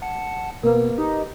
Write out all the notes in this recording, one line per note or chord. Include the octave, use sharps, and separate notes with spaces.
F#5 A5 C#7
B2 A#3 B3 A#4 B4
D#4 G4